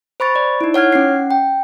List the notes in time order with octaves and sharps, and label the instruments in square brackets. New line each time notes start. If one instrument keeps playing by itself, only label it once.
[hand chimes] C5 B5 C#6 A6
D5
D#4 E4
C#5 F#5 F6 G#6
C#4 F#5 C7
G5